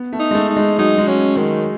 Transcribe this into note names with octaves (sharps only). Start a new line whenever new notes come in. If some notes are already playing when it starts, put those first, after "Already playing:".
Already playing: B3
A3
D#4
G#3
A3
D#4
G#3
F#3 D#4
G#3
F#3 C#4
D#3 G#3